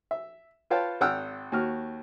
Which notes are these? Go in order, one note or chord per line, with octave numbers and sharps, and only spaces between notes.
E5
F4 B4 C#5 F5 G5 A5
G#1 F#5 G5 E6 F6
D#2 F#4 F6